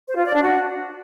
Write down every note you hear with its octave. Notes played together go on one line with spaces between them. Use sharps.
C5
F4
D5
D4
F#4